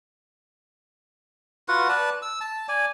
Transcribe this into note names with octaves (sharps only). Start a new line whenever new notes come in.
F4 F#4 B4 F#5
B4 D5 A5
E6
A5
D5 G#5